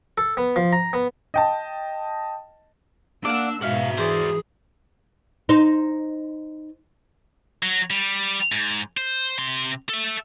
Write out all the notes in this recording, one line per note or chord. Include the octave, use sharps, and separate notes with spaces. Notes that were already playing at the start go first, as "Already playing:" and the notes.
A4
B3
F3
A#5
B3
D#5 G5 A5
A#3 D4 D5 F5 F#5 E6
G#2 B2 F#4 E5 F5
E3 G#4 C5 D5
D#4 C5
F#3
G3
G#2
C5
C3 C6
A4 E5